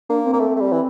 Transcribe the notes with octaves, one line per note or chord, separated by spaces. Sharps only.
A#3 D4
C4
A#3
A3
A3
G3
E3